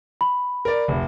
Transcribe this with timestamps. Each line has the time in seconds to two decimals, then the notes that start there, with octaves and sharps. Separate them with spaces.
0.21 B5
0.65 A#4 D5
0.88 F1